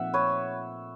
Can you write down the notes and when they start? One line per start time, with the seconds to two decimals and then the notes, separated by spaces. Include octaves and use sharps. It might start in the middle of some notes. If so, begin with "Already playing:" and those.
Already playing: A#2 F3 A3 C4 D#4 E5 F#5
0.14 B4 C#5